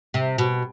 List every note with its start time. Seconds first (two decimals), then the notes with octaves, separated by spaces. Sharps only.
0.14 C3
0.38 B2